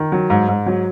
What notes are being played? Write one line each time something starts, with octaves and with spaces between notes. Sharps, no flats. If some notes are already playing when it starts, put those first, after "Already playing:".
Already playing: D#3
F#3
G#2
G#2
F#3